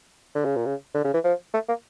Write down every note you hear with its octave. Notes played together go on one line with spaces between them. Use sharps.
D3
C#3
A#2
C#3
D3
C#3
E3
F3
A3
A#3